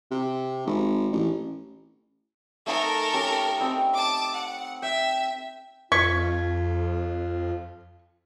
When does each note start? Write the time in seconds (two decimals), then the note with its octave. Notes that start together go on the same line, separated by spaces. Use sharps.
0.11 C3
0.67 G#1
1.12 A1
2.66 A3 D#4 A4 A#4 G#5
3.13 C#4 G4
3.61 C4 D#5 B5
3.94 A5 D6
4.35 F#5
4.82 E5 G5
5.92 F2 F4 C#6 G#6 B6